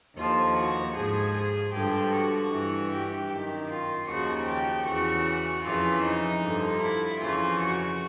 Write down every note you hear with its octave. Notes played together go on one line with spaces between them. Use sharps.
D#2 D3 F3 F4
F#4
G#2 F3 G#4
G#4
G2 D3 F3 G4
F#4
G2 E3
G4
F#2 D#3
F4
D#2 C#3 F3 F#4
G4
E2 C#3 E3 F#4
F2 C#3 E3 F4
D#4
G2 D3 F3
E4
F2 C#3 E3 F4
F#4